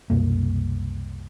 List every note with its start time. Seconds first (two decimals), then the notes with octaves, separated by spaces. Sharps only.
0.10 C2 F#2 B2 A#3